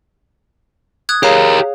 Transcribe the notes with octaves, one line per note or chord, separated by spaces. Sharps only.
D#6 F#6 G#6
G4 G#4 A#4 C#5 F5